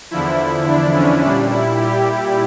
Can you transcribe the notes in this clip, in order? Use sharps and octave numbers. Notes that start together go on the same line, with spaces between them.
E2 D3 F3 E4
D4
C#4
A#2 G3 D4
E4
G4